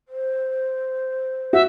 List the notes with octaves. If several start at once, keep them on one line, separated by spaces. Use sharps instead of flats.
C5
F#4 E5